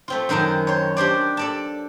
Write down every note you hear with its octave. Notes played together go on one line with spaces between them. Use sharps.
A3 C4 F4
F#2 D#3 A#4 C5 A5
C5 C#5
D4 G4 C5 D5
A4 D5 A5